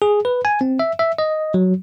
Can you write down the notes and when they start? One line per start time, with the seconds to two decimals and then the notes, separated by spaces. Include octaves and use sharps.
0.02 G#4
0.25 B4
0.45 G#5
0.61 C4
0.79 E5
0.99 E5
1.18 D#5
1.54 F#3